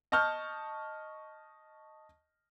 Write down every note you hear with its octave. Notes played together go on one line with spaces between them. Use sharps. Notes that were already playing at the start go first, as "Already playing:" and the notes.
D#5 A5 C#6 F6 G6